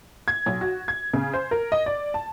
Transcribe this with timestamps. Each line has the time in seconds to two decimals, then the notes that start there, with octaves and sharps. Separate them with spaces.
0.28 G#6
0.46 B1
0.61 F#4
0.88 G#6
1.13 C#3
1.34 C5
1.51 A#4
1.72 D#5
1.86 D5
2.14 A5